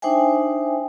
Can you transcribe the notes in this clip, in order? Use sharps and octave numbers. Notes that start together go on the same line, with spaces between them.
D4 D#4 C5 E5 G5 G#5